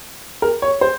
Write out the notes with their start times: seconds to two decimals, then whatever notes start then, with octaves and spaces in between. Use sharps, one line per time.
0.42 A#4
0.62 C#5
0.81 C5